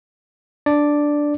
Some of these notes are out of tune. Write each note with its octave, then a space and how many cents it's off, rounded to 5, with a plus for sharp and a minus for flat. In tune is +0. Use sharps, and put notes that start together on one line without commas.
D4 +0 D5 +0